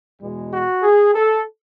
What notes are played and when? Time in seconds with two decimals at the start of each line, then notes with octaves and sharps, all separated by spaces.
0.20 E2 B2 G#3
0.52 F#4
0.83 G#4
1.15 A4